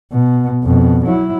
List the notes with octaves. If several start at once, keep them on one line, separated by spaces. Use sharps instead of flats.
B2
F2 B2
F#3 E4